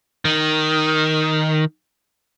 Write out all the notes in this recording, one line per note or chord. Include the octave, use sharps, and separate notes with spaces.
D#3